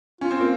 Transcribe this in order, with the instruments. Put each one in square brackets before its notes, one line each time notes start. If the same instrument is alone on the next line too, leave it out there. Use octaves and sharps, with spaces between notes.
[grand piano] C#4 [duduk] F4
[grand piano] C4
A#3